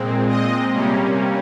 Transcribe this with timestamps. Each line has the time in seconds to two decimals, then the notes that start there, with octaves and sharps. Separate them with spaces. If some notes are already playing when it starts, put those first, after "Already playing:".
Already playing: A#2 G#3 C4
0.29 D#5
0.74 C3 G3 A#3 C#4